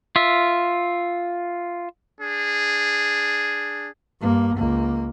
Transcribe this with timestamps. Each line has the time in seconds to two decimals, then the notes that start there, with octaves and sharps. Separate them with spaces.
0.16 F4 E5
2.20 D4 G#4
4.21 G2 A#3
4.57 C#2 A#3